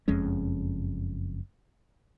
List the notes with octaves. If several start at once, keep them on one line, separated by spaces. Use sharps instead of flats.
F#1 F2 G#3 C#4